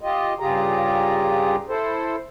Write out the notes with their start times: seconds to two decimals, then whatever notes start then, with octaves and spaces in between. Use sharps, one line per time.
0.01 F4 G4 D#5
0.40 G2 C#3 F4 G4 G#4 A#5
1.69 E4 A4 C5